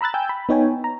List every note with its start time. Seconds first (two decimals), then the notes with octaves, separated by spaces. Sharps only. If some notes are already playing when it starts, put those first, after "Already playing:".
0.01 A#5 B5 E6 F#6 A6
0.14 G5 G#5 E6 G6
0.29 B5
0.49 B3 D#4 C#5 G5 G#5
0.84 A#5